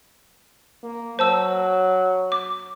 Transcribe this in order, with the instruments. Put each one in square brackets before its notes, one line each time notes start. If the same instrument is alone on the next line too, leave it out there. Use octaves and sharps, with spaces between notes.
[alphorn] A#3
[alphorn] F#3 [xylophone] C5 A5 E6
[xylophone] D6